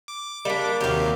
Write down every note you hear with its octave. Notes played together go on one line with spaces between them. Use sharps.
D6
G3 A#3 D4
D#2 C3 F#3 G4 F5